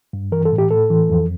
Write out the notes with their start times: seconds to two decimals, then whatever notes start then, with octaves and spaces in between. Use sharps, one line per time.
0.13 G2
0.32 E3 A#4
0.45 A4
0.52 A2
0.58 G4
0.71 A2 A4
0.90 E3
1.10 F2